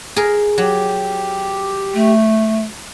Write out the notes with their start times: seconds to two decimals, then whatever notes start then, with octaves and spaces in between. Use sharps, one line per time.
0.16 G#4 A#4
0.58 F#3 G4
1.94 A3